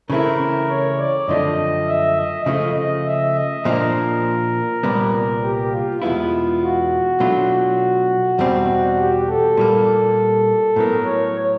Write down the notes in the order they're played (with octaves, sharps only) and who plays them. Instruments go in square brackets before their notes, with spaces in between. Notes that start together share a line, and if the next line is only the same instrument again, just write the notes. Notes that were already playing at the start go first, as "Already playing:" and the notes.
[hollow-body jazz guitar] C#3 E3 A3 C4 E4 [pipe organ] A#4
[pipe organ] C#5
D5
[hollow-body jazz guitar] F#2 D3 F3 A3 C4 [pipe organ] D#5
[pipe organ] E5
D#5
[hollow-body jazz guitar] C#3 F3 A3 [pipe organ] D#5
[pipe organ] D#5
E5
D#5
[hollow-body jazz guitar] A#2 F3 A#3 D4 [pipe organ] A#4
[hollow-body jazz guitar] C2 A#2 G3 B3
[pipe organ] G4
F4
[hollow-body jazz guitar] E2 B2 G#3 B3 E4 [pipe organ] F4
[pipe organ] F#4
[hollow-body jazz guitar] B2 F#3 A3 D4 F4
E2 B2 G3 C4
[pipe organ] G4
A4
[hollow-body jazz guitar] A#2 G3 A#3
[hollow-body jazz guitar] A2 F#3 B3 [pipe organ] A#4
[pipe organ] C#5